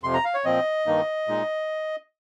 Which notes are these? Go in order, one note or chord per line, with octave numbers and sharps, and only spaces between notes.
F2 C3 F3 C6
A#5
F5
C#5
A#2 F3 C4 D#5
G2 D#3 A#3 D#4
A#2 G#3 D#4